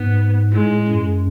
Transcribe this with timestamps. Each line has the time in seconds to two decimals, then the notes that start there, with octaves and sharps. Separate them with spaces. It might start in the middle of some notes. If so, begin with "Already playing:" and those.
Already playing: G#2 B3
0.52 A2 G#3
0.88 F#2